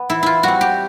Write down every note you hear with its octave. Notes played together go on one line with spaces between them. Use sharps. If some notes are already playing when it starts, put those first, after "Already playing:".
Already playing: B3
E3 E4
E4 F4
G3 C4 F#4
G4